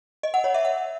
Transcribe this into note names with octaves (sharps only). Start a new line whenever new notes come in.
D#5
F#5
C#5
E5
F#5